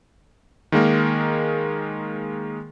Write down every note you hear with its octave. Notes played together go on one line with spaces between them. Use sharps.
D#3 G#3 A#3 A#4